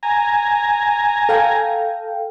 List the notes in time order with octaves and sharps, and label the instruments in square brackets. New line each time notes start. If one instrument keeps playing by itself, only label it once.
[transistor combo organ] G#5 A#5
[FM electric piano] A4 F5 G5